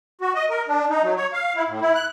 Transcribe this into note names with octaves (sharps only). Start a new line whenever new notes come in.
F#4
D#5
A#4
D4
D#4
F#3
C#5
F5
E4
A2
E4
F#6